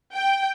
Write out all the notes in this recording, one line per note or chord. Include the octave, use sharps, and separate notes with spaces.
G5